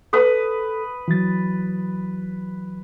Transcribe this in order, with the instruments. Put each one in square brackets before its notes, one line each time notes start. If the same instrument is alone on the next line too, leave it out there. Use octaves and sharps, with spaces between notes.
[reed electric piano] A4 [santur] B4 D#6
[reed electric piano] E3 F#3 A6